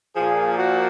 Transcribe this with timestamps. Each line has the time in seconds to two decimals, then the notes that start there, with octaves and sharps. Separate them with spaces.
0.16 A#2 F3 G#4
0.58 F#4